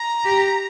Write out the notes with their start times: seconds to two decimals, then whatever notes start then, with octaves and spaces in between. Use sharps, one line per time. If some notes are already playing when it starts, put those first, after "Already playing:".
Already playing: A#5
0.25 G4